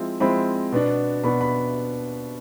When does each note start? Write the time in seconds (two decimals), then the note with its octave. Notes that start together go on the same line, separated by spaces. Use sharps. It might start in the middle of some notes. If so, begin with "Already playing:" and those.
Already playing: F3 G#3 C4 E4
0.20 F3 G#3 C4 E4 B5
0.72 B2 B3 D4
1.24 B2 B3 D4 B5
1.41 B5